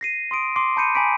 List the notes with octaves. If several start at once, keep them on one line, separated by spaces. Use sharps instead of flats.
A#6 C7 D#7
C6 D#6 D7
C6 D6 C7
A5 B5 G6 C#7 D#7
G#5 A#5 B5 D6 B6 D7